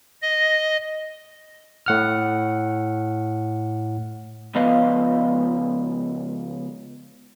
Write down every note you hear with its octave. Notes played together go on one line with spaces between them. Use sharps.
D#5
A2 F#5 F6
C#2 F3 B3 B4 D#5 F5